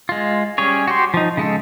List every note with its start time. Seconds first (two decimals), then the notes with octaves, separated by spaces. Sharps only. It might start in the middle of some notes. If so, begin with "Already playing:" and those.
0.09 G#3 F4
0.58 G3 C#4 G#4 C#5
0.87 F#4 G4 C6
1.14 F3 D#4
1.37 C#3 G#3 A4